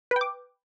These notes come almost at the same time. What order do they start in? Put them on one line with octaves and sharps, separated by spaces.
B4 G5 D6